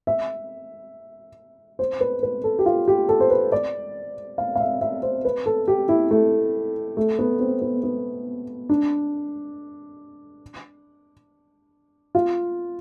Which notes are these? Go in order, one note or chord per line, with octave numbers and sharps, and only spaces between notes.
E5
C5
B4
B4
A4
G4
F4
G4
A4
C5
B4
D5
F5
F5
E5
E5
C5
B4
A4
G4
E4
A3
A3
B3
C4
B3
B3
D4
F4